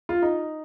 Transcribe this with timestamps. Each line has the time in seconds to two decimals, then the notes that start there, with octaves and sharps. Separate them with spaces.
0.09 F4
0.22 D#4